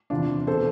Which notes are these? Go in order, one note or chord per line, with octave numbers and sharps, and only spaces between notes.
E2 C3 F3 D4 F4
B2 A4 C5